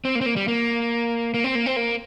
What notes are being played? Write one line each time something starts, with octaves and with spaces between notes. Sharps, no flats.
C4
A#3
C4
A#3
G3
A#3
A#3
C4
A#3
C4
A#3